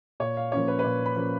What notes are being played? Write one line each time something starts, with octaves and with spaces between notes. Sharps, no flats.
A#2 C#5
F5
F3 A#3 C#4 C#5
B4
B4
A#2 C#5
B5
F3 A#3 C#4